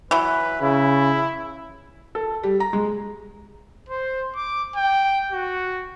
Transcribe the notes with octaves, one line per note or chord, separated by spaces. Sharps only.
E3 F#3 B4
C#3 E4
A4
G3
A#5
G#3
C5
D6
G5
F#4